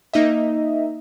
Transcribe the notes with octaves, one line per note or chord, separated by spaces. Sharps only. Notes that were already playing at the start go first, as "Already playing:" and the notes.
A#3 D#4 D#5 E5